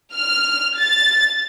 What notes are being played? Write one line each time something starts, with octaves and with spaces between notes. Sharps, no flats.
F6
A6